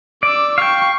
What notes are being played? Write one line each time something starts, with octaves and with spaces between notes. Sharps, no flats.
D5 D6 E6
F5 G5 C#6